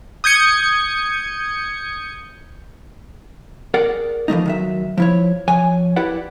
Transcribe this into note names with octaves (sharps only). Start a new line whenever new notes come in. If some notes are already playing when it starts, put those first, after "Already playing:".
D#6 G6 G#6 C#7
G#4 A#4 D5 F#5
E3 F3 A3 D#4
D#3 F#3 E5
F3 E4 C#5
F3 C#5 G#5
E4 G4 B4 D5 F#5